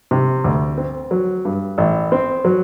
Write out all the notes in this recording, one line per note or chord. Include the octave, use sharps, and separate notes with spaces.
C3
D2
C4
F#3
G2
A1
C4
F#3